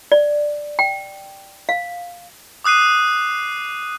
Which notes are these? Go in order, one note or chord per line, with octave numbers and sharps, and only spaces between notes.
D5
G5
F5
D6 D#6 F#6 C7 D#7